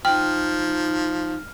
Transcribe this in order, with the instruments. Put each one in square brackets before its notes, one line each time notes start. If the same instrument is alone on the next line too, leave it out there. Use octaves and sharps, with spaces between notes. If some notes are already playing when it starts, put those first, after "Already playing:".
[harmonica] F3 [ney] D#4 [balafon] G5 [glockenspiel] F6